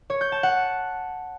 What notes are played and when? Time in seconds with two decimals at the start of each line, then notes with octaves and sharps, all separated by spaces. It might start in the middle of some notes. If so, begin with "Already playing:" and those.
0.10 C#5
0.21 G6
0.32 A5
0.43 F#5